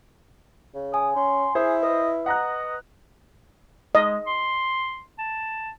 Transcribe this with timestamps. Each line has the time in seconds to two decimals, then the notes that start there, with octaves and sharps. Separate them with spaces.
0.74 C#3
0.94 G#5 D#6
1.16 C#4 C6
1.55 E4 G#4 C5
1.83 B4 D#5
2.26 D#5 F#5 A#5 F#6
3.95 G#3 D#5
4.27 C6
5.18 A5